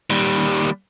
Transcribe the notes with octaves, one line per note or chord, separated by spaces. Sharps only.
D#2 G3